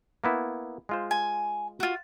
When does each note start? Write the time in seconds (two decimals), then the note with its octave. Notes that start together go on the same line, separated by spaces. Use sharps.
0.24 A#3 B3 E4
0.89 G#3 F4 C5
1.11 G#5
1.80 F4 F#4